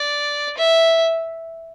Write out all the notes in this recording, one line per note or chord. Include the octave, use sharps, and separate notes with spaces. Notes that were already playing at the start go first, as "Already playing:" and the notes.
Already playing: D5
E5